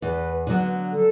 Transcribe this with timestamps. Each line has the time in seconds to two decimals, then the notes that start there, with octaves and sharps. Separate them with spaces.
0.02 E2 B4
0.47 D3 F#3 B3
0.92 A4